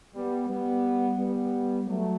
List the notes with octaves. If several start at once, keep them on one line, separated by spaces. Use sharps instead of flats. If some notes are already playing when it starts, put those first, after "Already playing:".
G3 B3
G3 B3
G3 B3
F#3 A3